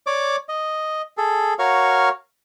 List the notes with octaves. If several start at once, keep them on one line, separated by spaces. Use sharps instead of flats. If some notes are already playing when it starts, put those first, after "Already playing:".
C#5 D5 D6
D#5
G#4 A4
F#4 A#4 C#5 F5 C#6